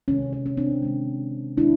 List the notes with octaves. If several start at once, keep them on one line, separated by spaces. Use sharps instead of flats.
C3 D#3 G#3 C#4
C#4
C#4
C4 D4
C3 D#3 G#3
D#3 G#3 D4 E4